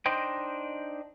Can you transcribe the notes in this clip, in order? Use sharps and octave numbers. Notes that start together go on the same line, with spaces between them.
D4 D#4 C5 D#5 G5